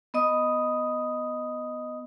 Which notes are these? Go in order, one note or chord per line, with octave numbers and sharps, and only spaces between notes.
B3 D#5 D#6